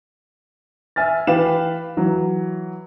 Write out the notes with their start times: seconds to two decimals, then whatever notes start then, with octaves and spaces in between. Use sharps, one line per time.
0.96 E5 G#5 F6 A6
1.27 E3 G4 B4 F5 E7
1.97 E3 F#3